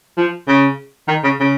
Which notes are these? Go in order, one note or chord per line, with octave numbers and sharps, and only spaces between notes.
F3
C#3
D#3
C#3
C#3